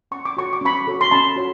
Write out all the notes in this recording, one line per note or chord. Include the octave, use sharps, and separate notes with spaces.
C#4 C#6
D6
F#4 A4 C#5 C#6
D6
C#4 B5 C#6
F#4 A4 C#5
C6
C#4 A5 B5
F#4 A4 C#5